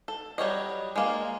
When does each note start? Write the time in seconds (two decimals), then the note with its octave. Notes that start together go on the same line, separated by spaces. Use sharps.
0.08 A4
0.38 F#3 G3 C#5 D#5
0.96 G#3 A#3 F4